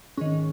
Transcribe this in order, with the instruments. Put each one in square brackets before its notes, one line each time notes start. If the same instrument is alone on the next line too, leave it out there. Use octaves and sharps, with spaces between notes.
[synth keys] G#2 D#3 C#4